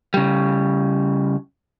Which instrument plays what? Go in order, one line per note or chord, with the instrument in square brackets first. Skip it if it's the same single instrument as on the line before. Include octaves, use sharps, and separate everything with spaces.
[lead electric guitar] C#3 G3